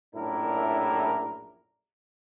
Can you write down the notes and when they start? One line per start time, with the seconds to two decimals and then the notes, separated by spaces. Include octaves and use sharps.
0.15 A#1 F#2 A2 D4 E4 A#4